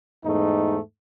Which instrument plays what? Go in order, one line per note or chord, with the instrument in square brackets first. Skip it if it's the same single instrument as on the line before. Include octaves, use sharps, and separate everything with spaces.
[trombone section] E2 G#2 A3 D#4